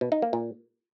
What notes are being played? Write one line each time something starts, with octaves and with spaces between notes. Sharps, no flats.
B2
D#4
A#3
A#2